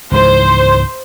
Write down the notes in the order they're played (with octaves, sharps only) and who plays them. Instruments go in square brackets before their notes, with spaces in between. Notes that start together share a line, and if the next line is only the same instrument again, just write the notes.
[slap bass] C#2 G#2 E3 [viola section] C5